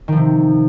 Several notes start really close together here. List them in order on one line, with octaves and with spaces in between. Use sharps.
D#3 F3 C3